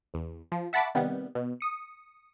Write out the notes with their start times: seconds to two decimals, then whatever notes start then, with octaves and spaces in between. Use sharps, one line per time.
0.14 E2
0.52 F3
0.73 E5 F#5 A5 B5 C#6 D6
0.95 C3 D#3 G3 B3
1.35 B2
1.61 D#6 C#7